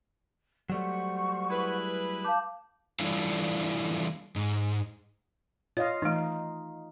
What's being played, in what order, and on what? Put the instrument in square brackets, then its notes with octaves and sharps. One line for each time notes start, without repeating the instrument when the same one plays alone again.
[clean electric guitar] F#3 G3 A3 [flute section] C5 F#5 C#6
[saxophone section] E4 G#4 B4
[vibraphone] F5 D6 [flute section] A5 G6
[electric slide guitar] E3 G3 A3 D4 E4 F4
G#2
[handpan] F4 D#5 F5 [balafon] C#5
[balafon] E3 A3 [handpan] D#4